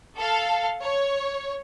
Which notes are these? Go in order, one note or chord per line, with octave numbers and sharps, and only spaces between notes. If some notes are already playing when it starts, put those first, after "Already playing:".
A4 F5
C#5